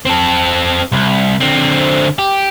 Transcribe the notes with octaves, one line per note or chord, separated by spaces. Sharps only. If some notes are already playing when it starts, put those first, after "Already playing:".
C4 A4
C2
D3 C4
G4